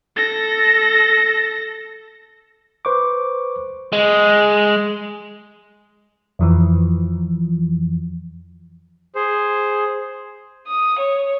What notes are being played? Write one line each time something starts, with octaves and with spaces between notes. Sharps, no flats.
A4 A#6
B4 C5 C#6 D6
G#3
F2 E3 F3
G#4 C5
D#6
C#5